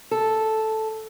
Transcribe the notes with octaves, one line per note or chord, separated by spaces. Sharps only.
A4